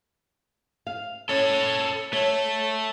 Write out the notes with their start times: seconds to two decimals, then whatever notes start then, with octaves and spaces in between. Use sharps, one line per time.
0.87 F5
1.29 C#4 A4 C#5
2.13 A3 C#5